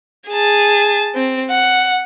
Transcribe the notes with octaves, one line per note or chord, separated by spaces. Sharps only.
G#4 A5
C4
F#5